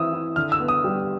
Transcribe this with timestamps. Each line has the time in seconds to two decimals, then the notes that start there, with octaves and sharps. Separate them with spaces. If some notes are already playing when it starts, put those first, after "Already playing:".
Already playing: E3 C4 D#6 E6
0.13 E4
0.36 D3 F6
0.52 E6
0.60 B3
0.68 D#6
0.84 G3